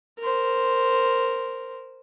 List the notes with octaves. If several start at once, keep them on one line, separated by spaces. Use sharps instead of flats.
A#4 C5